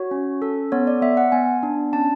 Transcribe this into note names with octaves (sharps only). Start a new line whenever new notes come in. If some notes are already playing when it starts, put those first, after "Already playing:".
Already playing: F#4 C#5
C#4
A4
B3 C#5
D5
B3 E5
F#5
B3 G#5
D4
C#4 A5